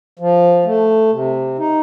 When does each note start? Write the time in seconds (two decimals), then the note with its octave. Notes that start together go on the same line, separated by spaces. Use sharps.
0.19 F3
0.65 A3
1.11 C3
1.58 D#4